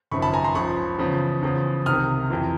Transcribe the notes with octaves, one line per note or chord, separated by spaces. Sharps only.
G#1 F#2 C#3 F3 B5 C#6
A5 B5
G#5 A#5
A#5 C6
C#2 C#3 F3 B5 C#6
E2 C#3 F3
E2 C#3 F3
C2 C3 D#3 D#6 F6
F2 C3 E3